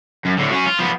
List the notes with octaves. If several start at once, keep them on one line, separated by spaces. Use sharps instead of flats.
F#2
A2 D3
F#3 C#4
F4
F3 B3